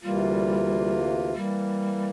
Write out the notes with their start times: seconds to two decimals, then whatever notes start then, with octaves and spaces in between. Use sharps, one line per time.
0.03 D2 C3 E3 G3 A#3 F4
1.35 E3 G3 A#3